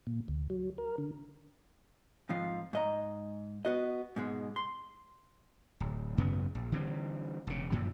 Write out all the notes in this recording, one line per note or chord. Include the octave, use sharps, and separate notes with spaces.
A#2
D2
F#3
A#4
D3
F2 G#2 F3 F4
G#2 D#5 A#5
B3 F#4 D#5
G#2 B2 G#3
C6
D1
G#1 F#2 C#3 B3
A#1
D3 E3 G3 C4
E1 C#3
F#2 A#2 F3 F#3